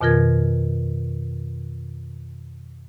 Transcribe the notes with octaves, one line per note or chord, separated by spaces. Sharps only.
F2 B2 D#3 F4 A#4 G#6